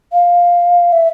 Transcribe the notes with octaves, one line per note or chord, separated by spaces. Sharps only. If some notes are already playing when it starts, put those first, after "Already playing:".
F5
E5